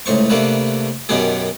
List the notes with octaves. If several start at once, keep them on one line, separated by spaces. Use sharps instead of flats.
C#2 A2 C5 C#6
C3 A3 A#3 D4 B4
F#2 B2 D#3 B3 G4 G#4